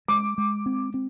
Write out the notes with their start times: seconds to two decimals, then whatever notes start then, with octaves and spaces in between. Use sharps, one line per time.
0.08 G#3 D6
0.38 G#3
0.66 C4
0.94 C4